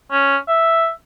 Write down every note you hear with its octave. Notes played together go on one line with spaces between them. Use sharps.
C#4
E5